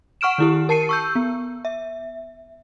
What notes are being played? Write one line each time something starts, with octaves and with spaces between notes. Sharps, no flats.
F#5 C#6 F6 D7 E7
D#3 E4 G4
A#4 A5 C7 C#7 D#7
C#6 E6 G6
B3
E5